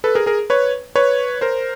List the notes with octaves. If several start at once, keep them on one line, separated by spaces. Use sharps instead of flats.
A4 B4
G#4 A#4
G#4 A#4
B4 C#5
B4 C#5
A#4 C5